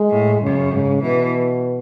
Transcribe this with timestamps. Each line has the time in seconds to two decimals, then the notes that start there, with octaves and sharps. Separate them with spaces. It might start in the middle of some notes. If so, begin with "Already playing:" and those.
Already playing: G#3
0.10 A2
0.41 F#2 C#3
0.71 G#2 C#3
1.03 B2 E3